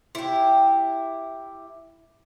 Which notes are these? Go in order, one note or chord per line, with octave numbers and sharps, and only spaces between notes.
E4 G4